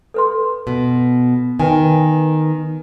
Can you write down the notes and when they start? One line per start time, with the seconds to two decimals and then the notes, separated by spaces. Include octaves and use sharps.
0.14 A4 B4 C6
0.67 B2
1.60 D#3 B4 G5 G#5